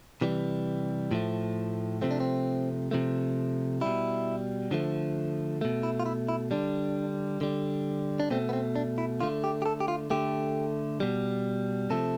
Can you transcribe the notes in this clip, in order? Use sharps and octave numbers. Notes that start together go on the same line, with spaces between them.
C3 E3 G3
A2 F3 A3
C3 F3 A3 C4
D4
C4
C3 F3 A3
B2 G3 E4
D3 F3 A3
B2 A3
E4
F4
E4
E4
D3 G3 D4
D3 G3
D4
B2 A3 C4
B3
C4
D4
E4
D3 A3 F4
G4
G4
A4
G4
F4
D3 A3 G4
B2 G3
C3 F3 A3 A4